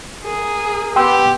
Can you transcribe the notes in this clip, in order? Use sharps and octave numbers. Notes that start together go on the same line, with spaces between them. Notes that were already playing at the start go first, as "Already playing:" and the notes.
G#4 A#4
B3 G4 G5 C6 E6